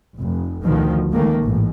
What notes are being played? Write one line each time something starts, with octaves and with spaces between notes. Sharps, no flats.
F1
D2 B2 D#3 F3
C#2 D#3 A3 A#3
A1 G#2